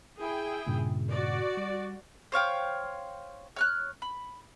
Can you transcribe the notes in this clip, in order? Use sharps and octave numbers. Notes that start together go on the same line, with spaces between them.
E4 G#4 G5
G2 A#2 C#3
F#4 D5
G3
C5 C#5 F5 G5
C#5 F6 F#6
B5